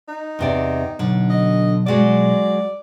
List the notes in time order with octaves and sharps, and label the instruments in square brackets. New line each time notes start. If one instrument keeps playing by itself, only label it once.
[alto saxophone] D#4
[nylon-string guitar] E2 C3 D5
[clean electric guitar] B1 [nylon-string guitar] D3
[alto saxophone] D#5
[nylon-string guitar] F#3 G#3 F#4 [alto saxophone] D5